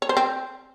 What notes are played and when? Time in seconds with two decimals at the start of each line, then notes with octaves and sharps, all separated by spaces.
0.02 C#5
0.09 C5
0.17 C4